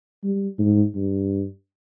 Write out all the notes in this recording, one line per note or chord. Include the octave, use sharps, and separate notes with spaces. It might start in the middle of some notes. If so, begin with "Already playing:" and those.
G3
G#2
G2